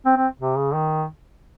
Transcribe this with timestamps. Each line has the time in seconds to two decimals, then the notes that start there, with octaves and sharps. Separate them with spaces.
0.06 C4
0.17 C4
0.39 C3
0.57 C#3
0.74 D#3